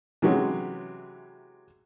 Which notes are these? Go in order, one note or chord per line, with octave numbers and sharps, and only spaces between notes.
C3 E3 F#3 G#3 C#4